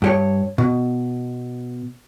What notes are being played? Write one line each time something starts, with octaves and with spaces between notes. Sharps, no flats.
G2 G4 C#5
B2